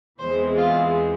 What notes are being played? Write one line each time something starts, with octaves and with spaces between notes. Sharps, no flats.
E2 E3 G#3 C4 C5
F4